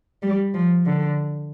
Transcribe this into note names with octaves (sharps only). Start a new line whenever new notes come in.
G3
F3
D3